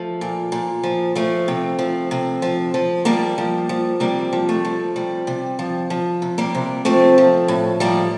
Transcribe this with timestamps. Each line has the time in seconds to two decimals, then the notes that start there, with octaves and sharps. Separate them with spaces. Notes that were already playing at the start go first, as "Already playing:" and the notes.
Already playing: F3 A3
0.21 A#2
0.52 A#2
0.83 F3
1.15 F3 A3
1.48 C3
1.79 F3
2.11 C3
2.42 F3
2.74 F3
3.05 F3 G3 A#3
3.38 F3
3.69 F3
4.00 C3 G3 A#3
4.33 F3
4.49 A3
4.65 F3
4.96 C3 G3
5.27 C3
5.59 F3
5.90 F3
6.22 C3
6.38 G3 A#3
6.55 C3
6.85 F3 A3 C4
7.18 F3
7.48 A2
7.80 F3 G3 A#3